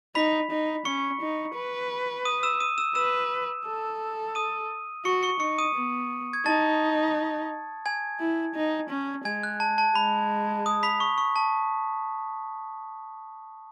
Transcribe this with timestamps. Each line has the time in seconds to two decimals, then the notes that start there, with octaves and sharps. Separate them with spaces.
0.15 D#4 B5 B6
0.51 D#4
0.85 C#4 C#6 C#7
1.21 D#4
1.55 B4
2.25 D#6 D#7
2.43 E6 E7
2.60 D#6 D#7
2.78 E6 E7
2.95 B4 E6 E7
3.66 A4
4.35 D#6 D#7
5.05 F#4 C#6 C#7
5.23 C#6 C#7
5.40 D#4 C#6 C#7
5.58 D#6 D#7
5.75 B3
6.33 G#6
6.45 D#4 A5 A6
7.86 G#5 G#6
8.20 E4
8.55 D#4
8.90 C#4
9.25 G#3 G#5 G#6
9.43 F#6
9.60 A5
9.78 A5
9.95 G#3 B5
10.66 D#6
10.83 B5 B6
11.00 C#6
11.18 C#6
11.36 A5